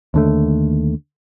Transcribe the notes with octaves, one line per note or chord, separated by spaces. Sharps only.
D#2 D3 A3